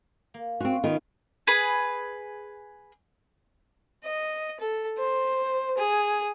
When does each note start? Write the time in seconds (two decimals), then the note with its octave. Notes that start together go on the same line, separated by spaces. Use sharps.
0.34 A#3
0.60 C4 C#4 F4 F#4 F#5
0.84 D#3 A3 B3 F4
1.47 G#4 B4
4.04 D#5
4.60 A4
4.98 C5
5.77 G#4